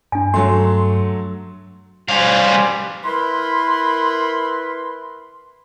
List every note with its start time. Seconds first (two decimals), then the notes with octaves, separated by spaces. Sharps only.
0.12 G2 D4 G#5
0.34 F#3 A3 C6
2.08 G3 C#4 C5 F5 G#5
3.04 E4 A#4 B4 B5 C6